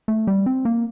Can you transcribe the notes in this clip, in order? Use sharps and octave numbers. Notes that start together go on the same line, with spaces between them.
A3
G3
C4
A#3